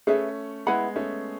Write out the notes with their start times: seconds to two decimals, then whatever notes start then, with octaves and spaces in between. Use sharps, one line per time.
0.07 A3 C#4 G#4 B4 E5
0.66 G#3 B3 E4 B4 F#5 B5
0.96 A3 C#4